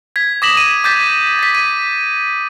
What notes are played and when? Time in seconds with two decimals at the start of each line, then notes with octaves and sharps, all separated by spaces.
0.16 G#6 B6
0.42 D6 D#6 A#6 B6 E7 F#7
0.57 D#7
0.84 D6 G6 A6 B6
1.39 A6 B6
1.55 D#7